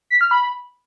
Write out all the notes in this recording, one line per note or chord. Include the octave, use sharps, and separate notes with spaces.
B6
F6
B5